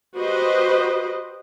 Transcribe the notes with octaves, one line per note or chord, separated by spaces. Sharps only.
F#4 G4 B4 C5 D#5